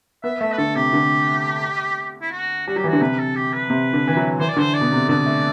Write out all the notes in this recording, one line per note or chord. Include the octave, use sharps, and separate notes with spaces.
B3 E5
A3 E5
B4
D3 A4
C3 G4
D3
E4
F#4
G3 F#4
F#3 G4
E3
D3 F#4
C3 B4
A4
G4
B4
C3
D3
E3
F#3
E3 C5
D5
D3 C5
D5
B2
C3
D3 D5
A3